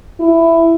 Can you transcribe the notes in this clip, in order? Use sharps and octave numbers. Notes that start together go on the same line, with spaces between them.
E4